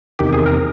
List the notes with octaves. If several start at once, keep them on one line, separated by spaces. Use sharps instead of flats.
E2 C3 D#3 G4
G#4
A#4